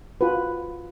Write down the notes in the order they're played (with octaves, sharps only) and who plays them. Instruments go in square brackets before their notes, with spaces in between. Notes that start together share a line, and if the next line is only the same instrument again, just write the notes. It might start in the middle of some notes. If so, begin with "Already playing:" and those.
[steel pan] F4 F#4 B4